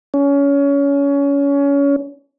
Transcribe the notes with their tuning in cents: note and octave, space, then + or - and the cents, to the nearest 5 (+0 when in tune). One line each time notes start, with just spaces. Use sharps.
C#4 +25